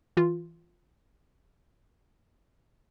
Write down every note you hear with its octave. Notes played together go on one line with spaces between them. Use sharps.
E3 F4